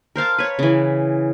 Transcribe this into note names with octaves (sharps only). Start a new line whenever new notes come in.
A#4 C5 F5 A5
B4 C#5
C#3 E3